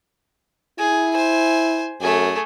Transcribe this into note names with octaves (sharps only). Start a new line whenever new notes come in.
E4 G#4
C5 G#5
F#2 A3 G#4